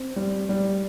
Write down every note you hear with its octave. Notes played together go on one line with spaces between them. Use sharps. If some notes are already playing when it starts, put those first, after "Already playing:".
Already playing: C4
G3
G3